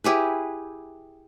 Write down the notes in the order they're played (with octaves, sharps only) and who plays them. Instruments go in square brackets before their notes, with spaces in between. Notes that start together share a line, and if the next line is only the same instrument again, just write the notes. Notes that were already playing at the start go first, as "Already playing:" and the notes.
[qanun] E4 G4 G#4 B4